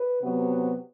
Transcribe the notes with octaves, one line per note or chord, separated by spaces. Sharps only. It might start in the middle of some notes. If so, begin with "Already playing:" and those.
Already playing: B4
C3 F#3 B3